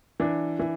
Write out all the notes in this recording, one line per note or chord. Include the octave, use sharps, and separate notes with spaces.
E3 D4
E3